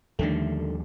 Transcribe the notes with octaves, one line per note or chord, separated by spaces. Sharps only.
D#2 D3 D#3 F3 G3 A3